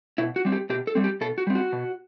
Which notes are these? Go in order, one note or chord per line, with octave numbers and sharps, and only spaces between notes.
B2 E4
F#4
G3 C4
G4
B2 G4
A4
G3 C4
G4
B2 A4
F#4
G3 C4
F#4
B2